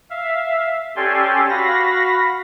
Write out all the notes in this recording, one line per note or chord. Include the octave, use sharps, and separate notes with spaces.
E5 F5
C#4 G4 A4 D5 G#5 C6
F#4 F5 B5 A#6